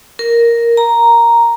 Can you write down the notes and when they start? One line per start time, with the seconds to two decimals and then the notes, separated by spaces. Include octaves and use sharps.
0.19 A#4
0.77 A#5